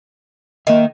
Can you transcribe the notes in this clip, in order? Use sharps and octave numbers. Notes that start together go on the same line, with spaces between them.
D#3 A#3 E5